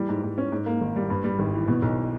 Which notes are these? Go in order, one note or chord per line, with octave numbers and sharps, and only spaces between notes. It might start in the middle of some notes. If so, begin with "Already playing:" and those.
Already playing: E3 G3
G#2
G#2
C#4
G#2
A#3
G#1
G3
G2
G3
G#1
E3
B2
B1